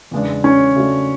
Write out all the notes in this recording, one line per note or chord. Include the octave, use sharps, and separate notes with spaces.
E2 C#3 G#3 B3 D4
C#4
C#3 F#3 A3 D4 F#4